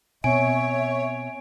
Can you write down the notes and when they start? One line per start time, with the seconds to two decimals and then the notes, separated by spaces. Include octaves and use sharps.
0.24 B2 C4 C#5 E5 G#5 D7